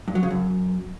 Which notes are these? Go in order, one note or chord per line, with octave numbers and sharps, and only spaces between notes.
G2
F#3
C#3
F#2